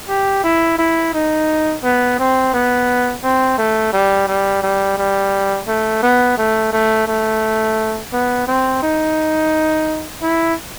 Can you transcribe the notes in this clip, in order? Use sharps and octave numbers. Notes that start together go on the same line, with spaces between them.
G4
E4
E4
D#4
B3
C4
B3
C4
A3
G3
G3
G3
G3
A3
B3
A3
A3
A3
B3
C4
D#4
E4